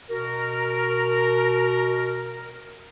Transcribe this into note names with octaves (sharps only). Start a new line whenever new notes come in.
B2 F#4 A#4